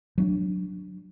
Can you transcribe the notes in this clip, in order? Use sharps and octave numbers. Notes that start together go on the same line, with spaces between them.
F#3 C#4 D4